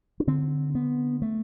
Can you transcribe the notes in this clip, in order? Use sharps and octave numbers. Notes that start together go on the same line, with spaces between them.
D4
D3 C4
D3 B3
A3